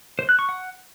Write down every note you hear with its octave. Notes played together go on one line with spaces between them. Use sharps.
C5
F#6
C#6
F#5